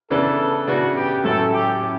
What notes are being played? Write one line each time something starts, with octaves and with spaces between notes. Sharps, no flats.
C#3 E3 B3 D4 A4
C#3 E3 B3 D4 F#4
G4
A2 F#3 C#4 E4 A4
G4
C#4 E4